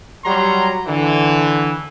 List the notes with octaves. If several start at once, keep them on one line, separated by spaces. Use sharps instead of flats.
F#3 G3 A#5 C6
D3 E3